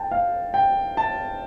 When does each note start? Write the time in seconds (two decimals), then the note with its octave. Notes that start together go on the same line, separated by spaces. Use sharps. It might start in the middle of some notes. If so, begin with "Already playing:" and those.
Already playing: G5 A5
0.11 F5
0.54 G5
0.97 A5